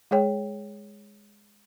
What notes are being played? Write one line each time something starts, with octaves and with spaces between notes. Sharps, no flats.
G#3 G#4 C#5 G5